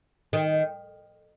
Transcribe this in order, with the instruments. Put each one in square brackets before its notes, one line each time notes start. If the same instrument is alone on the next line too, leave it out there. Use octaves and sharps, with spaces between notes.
[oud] D#3